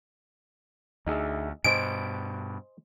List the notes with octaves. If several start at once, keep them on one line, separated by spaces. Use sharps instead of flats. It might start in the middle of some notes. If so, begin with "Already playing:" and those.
D2 D#4 G#4 E5
G2 B2 C5 D#5 G#5 D7